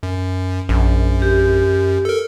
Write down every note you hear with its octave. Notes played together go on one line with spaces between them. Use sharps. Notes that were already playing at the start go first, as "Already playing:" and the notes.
F#2
A#1 F#2
G4
A4 A#4